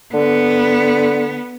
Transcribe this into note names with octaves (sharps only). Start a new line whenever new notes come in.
D3 B3